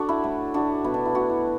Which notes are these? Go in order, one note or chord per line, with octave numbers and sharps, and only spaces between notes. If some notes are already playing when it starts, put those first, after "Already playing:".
Already playing: D4 F#4 A4
E4
A2 A3
D4 F#4
B2 B3 E4
D4
E4
D4 F#4
E4